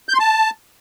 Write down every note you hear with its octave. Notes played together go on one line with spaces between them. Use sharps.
G6
C6
A5